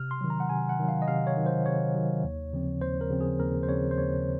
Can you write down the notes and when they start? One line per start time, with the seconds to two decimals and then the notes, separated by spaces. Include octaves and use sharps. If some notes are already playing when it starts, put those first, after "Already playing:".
Already playing: C3 F6
0.11 C6
0.21 D#3 F#3
0.30 A#5
0.40 F#5
0.49 C3 G#5
0.69 F#5
0.79 D#3 F#3
0.88 F5
1.02 D#5
1.08 C3 F5
1.27 C#5
1.37 D#3 F#3
1.46 C5
1.66 C3 C#5
1.95 D#3 F#3
2.24 D#2
2.53 C#3 F3 C4
2.82 D#2 C5
3.01 A#4
3.10 C#3 F3 C4
3.21 G#4
3.40 D#2 A#4
3.63 C5
3.69 C#3 F3 C4 C#5
3.91 C5
3.98 D#2 C#5